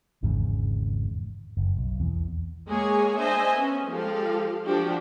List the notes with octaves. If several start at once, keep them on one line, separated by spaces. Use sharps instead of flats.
G#1 E2 G#2 C#3
F#1
B1
E2
G#3 A#3 G#4 C#5 G#5
D4 C5 D#5 E5 G#5
B3 C#4
F3 G#3 G4 A4 F5
F3 D4 F#4 G4